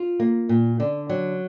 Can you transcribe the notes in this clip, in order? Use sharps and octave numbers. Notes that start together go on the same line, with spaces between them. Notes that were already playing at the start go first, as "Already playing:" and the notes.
Already playing: F4
A#3
A#2
D3
F#3